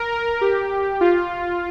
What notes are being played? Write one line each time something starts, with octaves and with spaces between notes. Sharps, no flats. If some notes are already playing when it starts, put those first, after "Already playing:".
Already playing: A#4
A#4
G4
F4